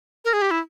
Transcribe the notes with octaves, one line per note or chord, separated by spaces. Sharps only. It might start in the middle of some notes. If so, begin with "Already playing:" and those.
A#4
G#4
G4
E4